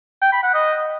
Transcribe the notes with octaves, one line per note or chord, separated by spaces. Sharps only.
G5
B5
F#5
D#5